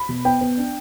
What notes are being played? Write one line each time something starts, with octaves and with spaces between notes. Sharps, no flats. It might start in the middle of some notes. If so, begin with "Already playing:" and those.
Already playing: B5
B2
B3 G5
B3
D4